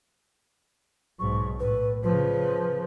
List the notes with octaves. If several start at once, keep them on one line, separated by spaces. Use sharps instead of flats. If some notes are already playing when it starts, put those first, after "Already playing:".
B1 G#2 C#6
A2 B4
C#3 F3 B4